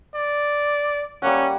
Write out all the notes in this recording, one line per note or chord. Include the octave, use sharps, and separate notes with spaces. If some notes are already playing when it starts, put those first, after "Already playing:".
D5
G3 A#3 C#4 F#5